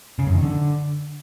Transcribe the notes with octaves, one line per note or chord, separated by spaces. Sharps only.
C#3
F#2
D#3
D3